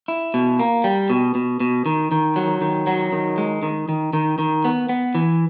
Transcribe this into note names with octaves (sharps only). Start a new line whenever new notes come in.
E4
B2
A#3
G3
B2
B2
B2
D#3
D#3
F#3
D#3
F#3
D#3
G#3
D#3
D#3
D#3
D#3
B3
B3
E3